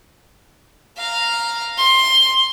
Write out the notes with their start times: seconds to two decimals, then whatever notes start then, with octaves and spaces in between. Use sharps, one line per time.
0.98 F5 A#5
1.78 C6